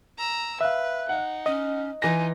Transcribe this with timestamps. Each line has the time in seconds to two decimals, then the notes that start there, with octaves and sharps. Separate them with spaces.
0.18 A#5 E6
0.61 B4 E5 F5 F#6
1.09 D#4 F#5
1.46 C#4 D#5
2.02 E3 D#4 F4 G#5 A#6